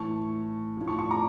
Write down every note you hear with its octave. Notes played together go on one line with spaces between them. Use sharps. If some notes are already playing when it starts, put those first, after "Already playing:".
Already playing: A2 E3 A5 C#6
A2 F3
A5 C#6
A5 C#6
A#5 D6